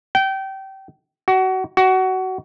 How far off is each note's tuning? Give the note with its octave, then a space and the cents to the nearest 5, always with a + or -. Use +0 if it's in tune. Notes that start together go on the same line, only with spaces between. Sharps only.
G5 -25
F#4 +25
F#4 +20